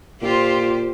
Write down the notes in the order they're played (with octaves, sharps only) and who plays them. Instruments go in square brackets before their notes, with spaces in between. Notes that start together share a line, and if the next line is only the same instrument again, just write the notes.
[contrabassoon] A#2 [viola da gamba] F4 [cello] G4 C5